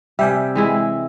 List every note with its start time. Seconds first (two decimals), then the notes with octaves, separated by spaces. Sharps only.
0.19 C3 G3 E5 G5 G#5
0.55 E3 G#3 E4